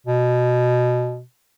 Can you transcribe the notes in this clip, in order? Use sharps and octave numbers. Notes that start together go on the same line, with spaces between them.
B2